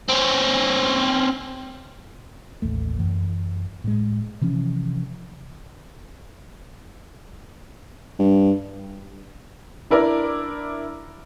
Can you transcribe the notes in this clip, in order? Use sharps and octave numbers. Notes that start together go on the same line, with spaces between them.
C4 C#4
A1 D#2 A3
F#2 E3
A2 G#3
C3 E3 F3 C#4
G2
D4 E4 A#4 D5